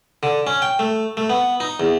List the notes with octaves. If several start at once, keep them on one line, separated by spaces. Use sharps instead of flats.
D3
C#4
G5
A3
A3
B3
D#4
E2